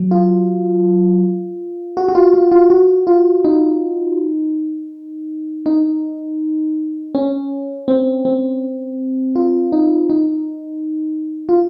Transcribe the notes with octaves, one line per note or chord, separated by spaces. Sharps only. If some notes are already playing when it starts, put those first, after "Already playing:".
Already playing: F#3
F4
F#4
F#4
F4
F4
F4
F#4
F4
D#4
D#4
C#4
C4
C4
F4
D#4
D#4
F4